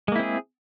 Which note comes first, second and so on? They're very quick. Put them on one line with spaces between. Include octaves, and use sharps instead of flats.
G#3 A#3 E4 C4 G#4